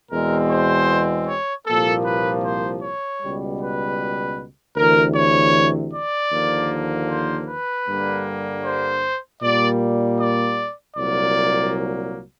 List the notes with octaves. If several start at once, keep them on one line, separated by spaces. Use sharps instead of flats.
E2 B2 G#3 C4 A#4
C5
C#5
C2 A#2 F3 A#3 A4
B4
C5
C#5
C#2 B2 G3
B4
D2 C3 E3 A#4
C#5
D5
D#2 D3 F3 A#3
C5
B4
G2 D3 G3 A#3
C5
A#2 G3 A#3 D5
D5
C2 A#2 F#3 A#3 D5